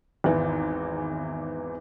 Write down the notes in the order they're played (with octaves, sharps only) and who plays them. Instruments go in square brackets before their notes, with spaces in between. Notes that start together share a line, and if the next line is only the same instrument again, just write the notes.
[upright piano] G#1 E2 E3